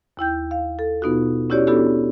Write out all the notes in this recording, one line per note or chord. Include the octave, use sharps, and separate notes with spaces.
D#2 E4 G5 G6
F5
A4
B2 B3 D#4 F4 F#4
C#4 E4 F#4 G4 C#5 D5
B3 D4 E4 F#4 G4 A4